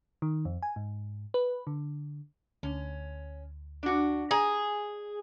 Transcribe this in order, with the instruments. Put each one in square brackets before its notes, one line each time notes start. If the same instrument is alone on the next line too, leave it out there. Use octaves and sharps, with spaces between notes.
[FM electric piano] D#3
F2
G#5
G#2
B4
D3
[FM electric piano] D2 [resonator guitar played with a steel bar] C#4
[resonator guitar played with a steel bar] D4 F#4
[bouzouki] G#4 [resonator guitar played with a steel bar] A#5